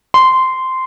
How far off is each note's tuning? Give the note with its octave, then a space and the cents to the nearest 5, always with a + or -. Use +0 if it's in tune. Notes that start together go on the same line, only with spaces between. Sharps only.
C6 -10